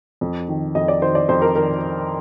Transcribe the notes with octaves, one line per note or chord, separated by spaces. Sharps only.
F2
D#3
F2 D#5
D5
D#3 C5
D5
F2 C5
A#4
D#3 A#4